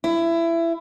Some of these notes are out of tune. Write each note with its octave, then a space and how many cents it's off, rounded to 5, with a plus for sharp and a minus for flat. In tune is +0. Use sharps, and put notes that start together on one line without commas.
E4 +20